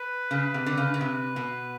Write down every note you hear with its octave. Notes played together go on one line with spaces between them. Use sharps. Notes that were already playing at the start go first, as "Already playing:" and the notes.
Already playing: B4
C#3
C3
D3
C#3
C#3
C3 B4
B2